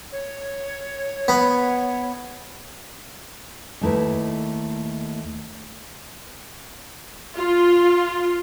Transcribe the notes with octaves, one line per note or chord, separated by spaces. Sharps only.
C#5
B3
D#2 A3 D#4 E4 B4
F4